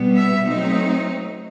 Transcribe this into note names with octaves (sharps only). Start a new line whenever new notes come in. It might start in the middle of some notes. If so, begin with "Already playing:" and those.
Already playing: B2 G3 B3
E5
F#3 A3 C4 D#4